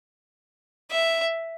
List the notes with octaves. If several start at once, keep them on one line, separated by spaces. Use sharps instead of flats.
E5